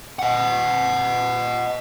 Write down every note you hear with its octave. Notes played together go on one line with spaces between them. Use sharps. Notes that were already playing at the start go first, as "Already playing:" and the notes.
D#5 F#5